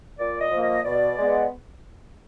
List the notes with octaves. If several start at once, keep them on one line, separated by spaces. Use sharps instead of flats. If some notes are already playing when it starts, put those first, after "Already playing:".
A#2 D5
D#5
F3 A#3
D#5
B2 D5
G#3 B3